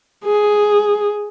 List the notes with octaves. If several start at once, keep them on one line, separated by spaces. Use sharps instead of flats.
G#4